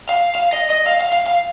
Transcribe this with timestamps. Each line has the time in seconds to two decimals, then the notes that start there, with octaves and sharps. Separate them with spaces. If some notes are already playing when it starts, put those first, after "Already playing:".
0.09 F5
0.35 F5
0.53 D#5
0.70 D#5
0.86 F5
1.01 F5
1.13 F5
1.26 F5